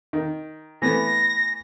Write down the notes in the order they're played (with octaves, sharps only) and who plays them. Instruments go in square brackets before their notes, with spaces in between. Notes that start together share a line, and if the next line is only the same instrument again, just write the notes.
[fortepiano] D#3
[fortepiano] E3 A3 B3 [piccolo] A#6